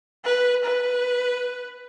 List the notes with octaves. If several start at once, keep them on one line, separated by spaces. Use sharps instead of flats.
B4
B4